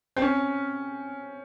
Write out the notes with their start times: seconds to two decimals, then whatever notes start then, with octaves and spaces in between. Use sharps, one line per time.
0.16 C4
0.22 C#4